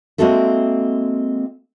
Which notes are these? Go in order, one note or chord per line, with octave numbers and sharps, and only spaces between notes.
G#3 A#3 C4 F#4 A4 E5